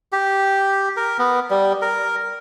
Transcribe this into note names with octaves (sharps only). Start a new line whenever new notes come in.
G4
A#4
B3
G3
A#4